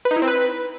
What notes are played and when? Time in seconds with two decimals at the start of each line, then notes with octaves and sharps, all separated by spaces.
0.05 B4
0.11 D#4
0.16 E4
0.22 C4
0.27 B4